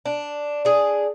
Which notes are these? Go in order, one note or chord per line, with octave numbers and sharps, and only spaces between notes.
D4
D4 G#4